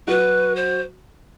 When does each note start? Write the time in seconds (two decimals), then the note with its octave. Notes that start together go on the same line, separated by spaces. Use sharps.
0.07 F#3 F#4 B4
0.55 C5